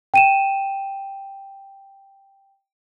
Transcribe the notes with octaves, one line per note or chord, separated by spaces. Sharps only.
G5 D#7 E7